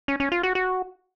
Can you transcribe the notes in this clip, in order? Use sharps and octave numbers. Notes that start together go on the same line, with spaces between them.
C#4
C#4
F4
F#4
F#4